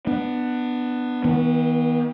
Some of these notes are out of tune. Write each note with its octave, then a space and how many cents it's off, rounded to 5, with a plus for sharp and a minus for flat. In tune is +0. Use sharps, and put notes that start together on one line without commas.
B3 +0 D4 +20
D#3 +40 B3 -20